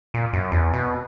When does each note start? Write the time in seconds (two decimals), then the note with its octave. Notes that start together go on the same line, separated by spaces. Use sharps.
0.14 A#2
0.33 F#2
0.51 E2
0.73 B2